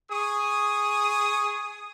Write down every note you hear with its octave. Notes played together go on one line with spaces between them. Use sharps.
G#4 C#6 D#6